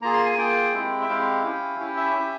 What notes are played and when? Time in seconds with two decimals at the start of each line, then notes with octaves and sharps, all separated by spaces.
0.01 A#3 F4 G#4 A#5
0.13 C6
0.25 G#5
0.37 A#3 F4 G#4 G5
0.73 G#3 C4 E4 G4
1.01 E5
1.08 G#3 C4 E4 G4 F5
1.44 C#4 E4 G4
1.79 C#4 E4 G4
1.97 E5
2.15 C#4 G4